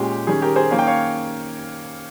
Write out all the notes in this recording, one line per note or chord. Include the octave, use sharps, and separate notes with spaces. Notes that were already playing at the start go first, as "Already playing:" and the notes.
Already playing: A#2 G#3 C#4 G4
D#3 G3 C#4 G#4
G4 A#4
G#4 C5
D#3 A#3 C#4 F5
G5
C#5 F5